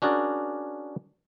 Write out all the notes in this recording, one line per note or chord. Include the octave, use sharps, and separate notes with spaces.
C#4 D4 F#4 G#4 A#4 D5